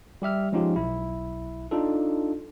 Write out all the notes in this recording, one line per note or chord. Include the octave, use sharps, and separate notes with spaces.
G3 G4 E5 F6
F3 G#3 C#4 D#4 F4 G4
B1 E4
D4 D#4 F4 A4